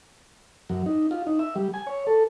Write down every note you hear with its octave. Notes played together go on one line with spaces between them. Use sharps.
F#2
D#4
F4
D#4
E5
G3
G#5
C#5
A4